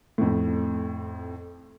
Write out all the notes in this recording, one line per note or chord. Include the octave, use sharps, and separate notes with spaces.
F2 A2